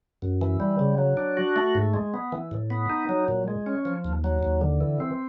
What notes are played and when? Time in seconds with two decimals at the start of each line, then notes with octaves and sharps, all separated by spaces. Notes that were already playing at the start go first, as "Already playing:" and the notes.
0.22 F#2
0.42 E3
0.60 G3
0.79 C#3
0.98 F#3
1.17 D4
1.37 F#4
1.56 A3
1.75 G#2
1.94 G#3
2.14 B3
2.32 E3
2.51 A2
2.70 B3
2.90 D#4
3.09 F#3
3.28 A#2
3.48 G#3
3.66 C#4
3.85 F3
4.05 D#2
4.24 F#3
4.43 D#2
4.61 D3
4.81 E3
5.00 C4